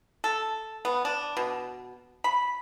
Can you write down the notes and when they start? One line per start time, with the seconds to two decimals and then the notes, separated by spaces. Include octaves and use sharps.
0.24 A4
0.85 B3
1.05 D4
1.37 B2
2.24 B5